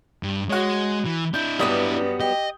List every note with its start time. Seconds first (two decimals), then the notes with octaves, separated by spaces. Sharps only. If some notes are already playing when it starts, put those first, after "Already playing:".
0.23 G2
0.49 G#3 F#4 C#5
1.06 E3
1.34 D4 E4 G6
1.59 G2 F#3 G3 B3 D5 D#6
2.20 G4 D#5